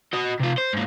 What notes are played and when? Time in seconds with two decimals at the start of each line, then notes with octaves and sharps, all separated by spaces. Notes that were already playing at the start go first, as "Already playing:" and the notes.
0.13 F#4 D#5
0.40 C3 F4
0.58 C5
0.73 G#2 A#3